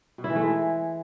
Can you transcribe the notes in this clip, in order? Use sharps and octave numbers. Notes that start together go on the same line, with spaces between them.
B2
E4
E3
A3
G#3